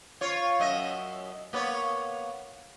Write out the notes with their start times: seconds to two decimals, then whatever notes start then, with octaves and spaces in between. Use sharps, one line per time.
0.21 F4 C#5
0.60 F#2 D#5 E5
1.53 A#3 B3 C#5